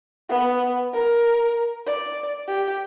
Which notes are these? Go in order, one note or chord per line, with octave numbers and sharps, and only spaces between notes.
B3
A#4
D5
G4